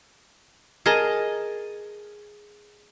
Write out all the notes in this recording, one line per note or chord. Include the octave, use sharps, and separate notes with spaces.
G#4 A#4 D#5 A5